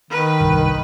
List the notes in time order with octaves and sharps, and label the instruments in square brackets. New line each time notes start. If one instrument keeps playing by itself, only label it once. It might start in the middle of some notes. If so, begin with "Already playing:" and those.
[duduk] D#3 [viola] B4
[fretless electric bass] G1 C2 G2